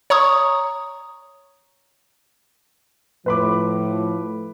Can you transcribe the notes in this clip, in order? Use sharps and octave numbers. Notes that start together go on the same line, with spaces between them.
C#5 A#5 C#6 D#6
A2 F3 B4 B5 D6